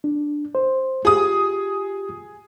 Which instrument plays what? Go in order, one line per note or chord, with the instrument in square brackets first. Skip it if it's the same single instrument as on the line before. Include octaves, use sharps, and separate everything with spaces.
[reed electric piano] D4
C5
[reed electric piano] F4 G4 [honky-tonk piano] G#4 D#6